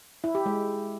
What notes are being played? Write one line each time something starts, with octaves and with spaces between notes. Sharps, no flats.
E4
G4
G#3